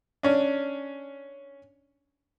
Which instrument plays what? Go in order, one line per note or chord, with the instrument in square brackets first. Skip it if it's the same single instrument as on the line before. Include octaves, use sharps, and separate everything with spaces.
[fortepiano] C#4 D4